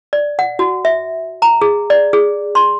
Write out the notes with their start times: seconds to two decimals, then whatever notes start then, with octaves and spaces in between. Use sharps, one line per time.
0.13 D5
0.39 F#5
0.59 F#4
0.85 E5
1.42 A#5
1.62 G#4
1.90 D5
2.13 G#4
2.55 C6